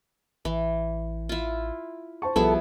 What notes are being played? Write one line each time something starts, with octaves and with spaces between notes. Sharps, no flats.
A1 E3
E4 F4
C5 A5 C#6
B1 F3 G3 B3 E4 G#4 A4 B4